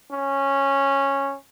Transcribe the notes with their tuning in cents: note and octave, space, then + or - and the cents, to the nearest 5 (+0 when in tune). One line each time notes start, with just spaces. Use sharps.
C#4 -10